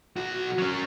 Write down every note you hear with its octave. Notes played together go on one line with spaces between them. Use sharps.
B1 F#4
F#3 C#4